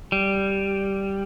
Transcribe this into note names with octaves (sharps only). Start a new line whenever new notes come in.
G3